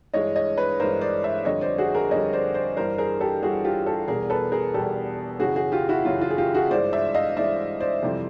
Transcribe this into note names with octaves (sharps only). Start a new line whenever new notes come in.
G2 E3 G#3 C#5 D#5
C#5 D#5
B4 C#5
G2 E3 G#3 A#4 C5
C5 D5
D5 E5
F2 D3 G3 C#5 D#5
C5 D5
F#4 G#4
G#4 A#4
F2 D3 G3 C#5 D#5
C5 D5
C5 D5
G2 E3 G3 A#4 C5
G#4 A#4
G4 A4
G2 E3 G3 F#4 G#4
F4 G4
G4 A4
E2 B2 G3 G#4 A#4
A4 B4
G#4 A#4
E2 B2 G3 G4 A4
F#2 C#3 E3 F#4 G#4
F#4 G#4
F4 G4
E4 F#4
F#2 C#3 E3 F4
F4
G#4
F4 G4
F#4 G#4
G2 E3 G#3 C5 D5
D5 E5
D#5 F5
G2 E3 G#3 D5 E5
C5 D5
F2 C3 E3 G3